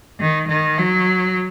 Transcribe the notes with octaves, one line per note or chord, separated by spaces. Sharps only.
D#3
D#3
F#3